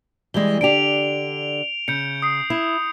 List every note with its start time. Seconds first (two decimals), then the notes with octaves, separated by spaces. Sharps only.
0.34 E3 G3 G#3 G7
0.61 D3 D4 G4 D7 F7
1.88 C#3 G6 C#7
2.22 D#6 C7
2.50 E4